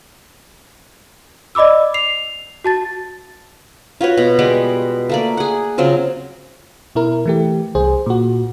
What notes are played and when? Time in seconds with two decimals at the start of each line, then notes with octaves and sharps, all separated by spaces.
1.55 D5 D#5 B5 D6 E6
1.94 C7 F7
2.64 F#4 A5 A6
4.01 F4 F#4 B4 C#5
4.17 B2
4.39 G3 G#3 B3 D6
5.09 A3 A#3 D5
5.37 G#4 F#5
5.78 C#3 F#3 C4 F4
6.95 B2 E4 A#4
7.26 E3 A3 G4
7.75 C2 G#4 C5
8.06 A#2 F#4